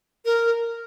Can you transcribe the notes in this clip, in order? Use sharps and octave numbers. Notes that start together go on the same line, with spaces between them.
A#4